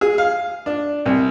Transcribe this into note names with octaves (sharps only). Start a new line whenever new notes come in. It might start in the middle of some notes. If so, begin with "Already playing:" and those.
G#4
F5
D4
C2